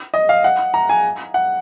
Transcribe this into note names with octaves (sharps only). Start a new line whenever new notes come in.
D#5
F5
F#5
A#5
G#5
F#5